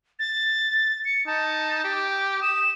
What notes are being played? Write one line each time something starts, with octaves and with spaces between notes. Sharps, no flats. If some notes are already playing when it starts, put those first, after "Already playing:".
A6
C#7
D#4 A5
G4 D6
D#6 E7